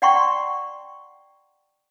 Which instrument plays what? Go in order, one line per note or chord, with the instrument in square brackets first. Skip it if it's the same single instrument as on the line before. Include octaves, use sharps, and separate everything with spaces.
[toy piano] D5 F#5 G5 A#5 C6 C#6